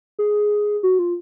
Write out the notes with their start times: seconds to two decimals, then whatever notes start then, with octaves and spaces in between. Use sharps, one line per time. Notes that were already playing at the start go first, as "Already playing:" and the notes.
0.19 G#4
0.83 F#4
0.99 F4